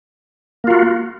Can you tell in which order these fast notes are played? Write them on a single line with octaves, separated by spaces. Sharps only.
A#3 F4 F#4